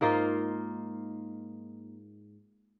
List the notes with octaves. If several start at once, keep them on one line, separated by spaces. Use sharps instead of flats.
G#2 A#3 D#4 F4